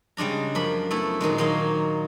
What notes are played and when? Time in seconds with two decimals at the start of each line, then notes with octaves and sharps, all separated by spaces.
0.17 C#3 G3 G#3 D4 A#5
0.55 F#2 F3 D4 B5
0.91 A3 B3 E4 A4
1.21 A#2 D#3 F#3 G#3
1.38 D#3 F#3 A#3 D#4 C5 C#5